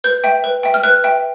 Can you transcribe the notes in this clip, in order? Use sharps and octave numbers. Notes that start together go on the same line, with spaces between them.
B4 G6
E5 G5
B4
E5 G5
F6
B4 F#6
E5 G5